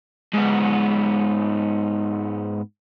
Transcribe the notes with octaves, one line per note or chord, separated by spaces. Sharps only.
G#2 B3